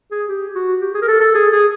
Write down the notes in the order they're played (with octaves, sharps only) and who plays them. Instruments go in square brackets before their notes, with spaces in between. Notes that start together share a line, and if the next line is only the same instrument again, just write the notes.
[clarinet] G#4
G4
F#4
G4
G#4
A#4
A4
A4
G#4
G#4